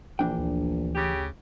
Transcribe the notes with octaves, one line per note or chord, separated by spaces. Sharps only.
A#1 E3 D4 G5
D2
C#3 G4